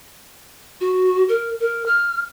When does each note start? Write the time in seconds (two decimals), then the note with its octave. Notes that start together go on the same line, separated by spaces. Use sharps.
0.81 F#4
1.29 A#4
1.60 A#4
1.86 F6